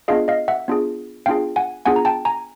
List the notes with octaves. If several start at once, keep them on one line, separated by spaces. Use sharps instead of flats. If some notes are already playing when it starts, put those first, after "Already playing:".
B3 D4 F4 G#4 D#5 F5
D#5 F5
E5 F#5
B3 D4 F4 G#4
B3 D4 F4 G#4 F5 G5
F#5 G#5
B3 D4 F4 G#4 F#5 G#5
A#5
G5 A5
G#5 A#5